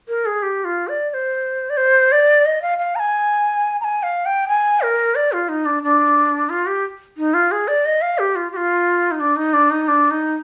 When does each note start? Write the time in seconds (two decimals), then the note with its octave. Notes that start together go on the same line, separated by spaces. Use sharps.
0.08 A#4
0.26 G#4
0.43 G4
0.65 F4
0.88 D5
1.10 D5
1.14 C5
1.70 D5
1.77 C5
2.12 D5
2.46 D#5
2.62 F5
2.79 F5
2.96 A#5
2.99 G#5
3.81 A#5
3.84 G#5
4.03 F5
4.26 G5
4.48 G#5
4.82 A#4
5.15 D5
5.32 F4
5.49 D#4
5.66 D4
5.83 D4
6.50 F4
6.66 G4
7.18 D#4
7.34 F4
7.52 G#4
7.68 D5
7.86 D#5
8.02 F5
8.19 G4
8.36 F4
8.52 G4
8.56 F4
9.11 D#4
9.20 D4
9.36 D#4
9.54 D4
9.71 D#4
9.88 D4
10.11 D#4